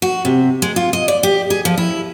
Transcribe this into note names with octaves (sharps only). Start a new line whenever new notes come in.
F#4
C3
G#3
F4
D#5
D5
G4
G#4
F3
E4